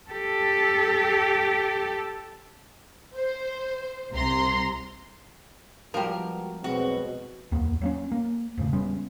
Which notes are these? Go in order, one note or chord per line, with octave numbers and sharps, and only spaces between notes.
G4 A4
C5
C2 C3 A#5 C6
F3 G3 G#3 B3 F#4 A#4
B1 E2 B2 F#3 G#3 C4 F#4
D1 E2 A#3 B3
F#3 A#3 C#4
A#3
E1 A2 C#3
G3 G#3 B3 C#4